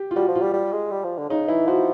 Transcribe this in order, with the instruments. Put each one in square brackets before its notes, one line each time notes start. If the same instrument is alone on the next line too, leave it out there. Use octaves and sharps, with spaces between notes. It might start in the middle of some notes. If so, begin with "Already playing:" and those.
Already playing: [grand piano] G4
F4
[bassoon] G3 [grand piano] F#4
[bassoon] F3
[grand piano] F4
[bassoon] G3
G3
G#3
G3
F3
D3
[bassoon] C#3 [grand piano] D#4
[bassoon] E3 [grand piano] E4
[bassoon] F3 [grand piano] F#4